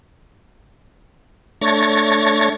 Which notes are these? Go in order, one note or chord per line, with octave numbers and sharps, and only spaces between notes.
A3 D4 C#5 C#6 A6 A#6